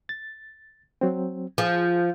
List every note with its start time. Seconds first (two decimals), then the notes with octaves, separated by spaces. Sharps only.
0.09 A6
1.01 F#3 C4
1.58 F3 G#4